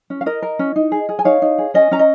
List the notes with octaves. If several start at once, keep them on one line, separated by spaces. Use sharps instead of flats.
C#4
F5
A#4 D#5
A#4
C#4
D#4
G#4
G#4
G#5
D#4 C#5 F5
D#4
G#4
C#4 D#5 G#5
C#4 A#5
D#5